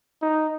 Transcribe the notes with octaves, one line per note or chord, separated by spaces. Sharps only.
D#4